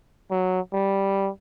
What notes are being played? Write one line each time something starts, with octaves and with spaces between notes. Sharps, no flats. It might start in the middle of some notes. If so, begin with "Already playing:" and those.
F#3
G3